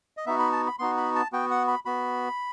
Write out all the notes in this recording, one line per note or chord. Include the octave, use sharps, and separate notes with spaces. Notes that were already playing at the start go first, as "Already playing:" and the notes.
D#5
B3 D#4 F#4 E5
B5
A5
B5
B3 D#4 F#4 C6
B5
A5
B3 F#4 G5
F#5
B5
B3 F#4 B5